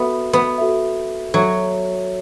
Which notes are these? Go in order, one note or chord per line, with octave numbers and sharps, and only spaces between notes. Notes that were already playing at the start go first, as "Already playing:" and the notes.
Already playing: B3 F#4 A4 E5
B3
F#4 A4 E5
F#3 F#4 A4 E5